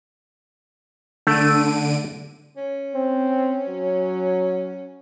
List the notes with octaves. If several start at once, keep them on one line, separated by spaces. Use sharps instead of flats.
D3 A3 D7 D#7
C#4
C4
F#3